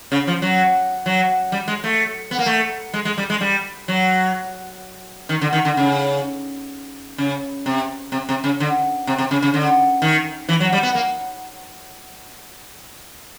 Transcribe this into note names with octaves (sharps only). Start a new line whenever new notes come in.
C#3
F3
F#3
F#3
G3
G#3
A3
B3
A#3
A3
G#3
G#3
G3
G#3
G3
F#3
D#3
D3
D#3
D3
C#3
C#3
C3
C3
C3
C#3
D3
C3
C3
C#3
C#3
D3
D#3
E3
F#3
G3
B3
A#3